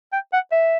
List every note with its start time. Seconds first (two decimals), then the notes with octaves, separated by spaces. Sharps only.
0.13 G5
0.33 F#5
0.52 E5